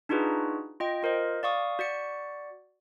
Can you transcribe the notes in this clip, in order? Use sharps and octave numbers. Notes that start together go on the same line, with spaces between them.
D4 D#4 F4 F#4 G#4 B4
F4 D#5 G5
F4 A#4 C5 D#5
D5 F5 C#6 D#6
F#4 D5 C#7